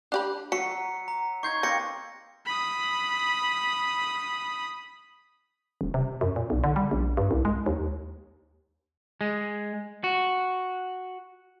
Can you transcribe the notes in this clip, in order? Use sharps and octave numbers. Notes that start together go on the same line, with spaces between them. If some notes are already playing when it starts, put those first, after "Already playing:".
D4 G4 B5 F#6
F#3 F#4 B6 C#7
A#5
D#4 C6 C#6 G6 G#6
A#3 C4 B4 A#6 C#7
B5 D#6
D#1
C3
F#2
A#2
B1
D3
G3
A#1
G2
C2
G#3
D#2
G#3
F#4